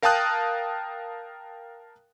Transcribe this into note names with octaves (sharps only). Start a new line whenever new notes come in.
A#4 F5 G5 A5 D#6 F#6